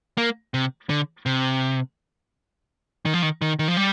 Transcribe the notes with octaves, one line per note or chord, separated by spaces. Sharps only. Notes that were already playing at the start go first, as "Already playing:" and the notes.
A#3
C3
D3
C3
D#3
F3
D#3
D#3
D#3
F3
G3